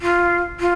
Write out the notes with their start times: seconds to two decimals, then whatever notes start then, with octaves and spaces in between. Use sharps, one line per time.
0.02 F4
0.60 F4